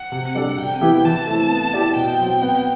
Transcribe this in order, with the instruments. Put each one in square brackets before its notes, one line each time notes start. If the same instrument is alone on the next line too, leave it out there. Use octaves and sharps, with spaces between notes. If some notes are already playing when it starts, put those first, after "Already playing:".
Already playing: [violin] F#5
[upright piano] C3
G3 D4 A4
[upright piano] C3 [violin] G5
[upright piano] E3 B3 E4 G4
[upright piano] E3 [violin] A5
[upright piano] A3 C4 E4 A4
B3
E4 G4 D5
[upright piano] B2 [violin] G5
[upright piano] F#3 C4
B3